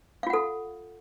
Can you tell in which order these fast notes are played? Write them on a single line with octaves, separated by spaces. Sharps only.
F5 F4 F#5 A4